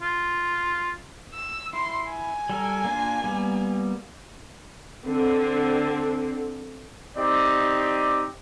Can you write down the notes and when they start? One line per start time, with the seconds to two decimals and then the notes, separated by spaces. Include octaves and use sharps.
0.02 F4
1.34 E6
1.73 E4 C6
2.09 G#5
2.49 G3 A4 A#4
2.84 A#3 D4 F4
3.24 G3 A#3 B3
5.05 D3 C4
7.18 C4 D#4 G4 D5 D#5